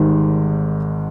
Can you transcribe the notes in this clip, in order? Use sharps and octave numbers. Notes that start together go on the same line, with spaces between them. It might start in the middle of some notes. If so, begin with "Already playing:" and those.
Already playing: G#1 G#2 D#3 G3